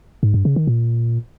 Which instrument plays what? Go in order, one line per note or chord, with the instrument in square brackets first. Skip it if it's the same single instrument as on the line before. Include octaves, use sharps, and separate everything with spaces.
[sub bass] G#2
G2
C#3
D#3
A#2